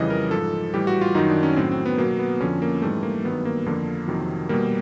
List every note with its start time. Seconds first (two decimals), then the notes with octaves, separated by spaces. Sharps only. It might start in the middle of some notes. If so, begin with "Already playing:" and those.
Already playing: F2 C#3 E3 G3 D#5
0.10 A#4
0.31 G#2 F3 A4
0.74 A2 E3 G3 G4
0.87 F#4
1.01 F4
1.15 F#2 D#3 F#3 D#4
1.30 D4
1.43 C#4
1.56 A2 F#3 C4
1.72 C4
1.86 B3
1.98 B2 F#3 A#3
2.19 B3
2.40 F2 D3 F3 C#4
2.62 A#3
2.82 G#2 E3 G3 A3
3.03 A#3
3.24 G2 D#3 F#3 B3
3.45 A#3
3.66 F2 D3 F3 A#3
4.08 F2 C3 D#3 F#3
4.49 B2 G3 A#3